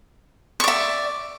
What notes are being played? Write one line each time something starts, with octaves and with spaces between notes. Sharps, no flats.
D5 E5 C#6